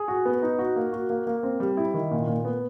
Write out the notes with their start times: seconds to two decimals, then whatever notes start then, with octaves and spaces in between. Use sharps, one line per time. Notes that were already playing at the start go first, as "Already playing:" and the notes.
Already playing: G#4
0.08 F#4
0.25 B3
0.42 D#4
0.59 F#4
0.76 A#3
0.93 F#4
1.10 A#3
1.27 A#3
1.43 C4
1.60 G3
1.77 E4
1.94 D#3
2.11 A#2
2.27 A#2
2.45 B3